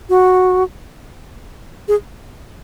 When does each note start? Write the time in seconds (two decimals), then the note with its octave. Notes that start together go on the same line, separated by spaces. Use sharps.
0.09 F#4
1.88 G#4